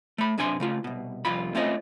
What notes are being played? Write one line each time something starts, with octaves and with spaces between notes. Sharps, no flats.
A3 B5
F#2 C3 D4 G#5 B5 C6
C#3 A3 F4
C2 B2
C2 F2 F4 B5
A3 C4 C#4 F4 C#5 D#5